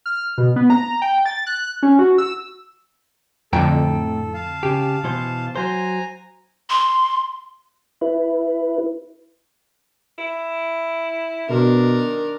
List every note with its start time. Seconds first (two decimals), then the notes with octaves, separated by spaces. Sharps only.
0.06 F6
0.38 B2
0.56 B3
0.70 A#5
1.02 G5
1.26 A6
1.47 F#6
1.83 C#4
1.99 F#4
2.18 E6
3.53 F2 A2 D3 A4 G5 A#5
4.34 F5 A5
4.63 C#3 G4
5.04 B2 E3 C5
5.56 F#3 C5 G#5 A#5
6.70 C6
8.01 E4 B4
10.18 E4
11.50 B2 D#3 D4 A#4